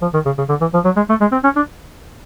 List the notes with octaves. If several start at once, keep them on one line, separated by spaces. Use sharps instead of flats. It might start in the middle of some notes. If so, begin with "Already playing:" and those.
F3
D#3
C#3
C#3
D3
E3
F3
F#3
G#3
A3
G#3
C4
C#4
D4